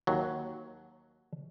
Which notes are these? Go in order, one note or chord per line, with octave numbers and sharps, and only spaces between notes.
D#2 F#3